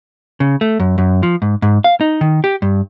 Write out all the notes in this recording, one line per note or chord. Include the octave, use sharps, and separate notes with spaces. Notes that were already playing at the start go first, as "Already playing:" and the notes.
C#3
A3
F#2
F#2
F3
G#2
G#2
F5
D#4
D#3
G4
G2